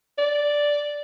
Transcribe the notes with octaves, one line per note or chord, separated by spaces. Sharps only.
D5